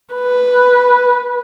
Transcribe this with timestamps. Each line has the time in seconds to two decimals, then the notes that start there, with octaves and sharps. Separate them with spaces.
0.14 B4